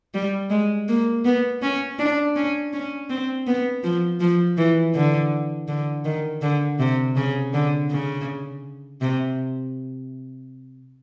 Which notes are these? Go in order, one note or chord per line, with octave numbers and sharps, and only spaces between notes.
G3
G#3
A#3
B3
C#4
D4
C#4
C#4
C4
B3
F3
F3
E3
D3
D3
D#3
D3
C3
C#3
D3
C#3
C3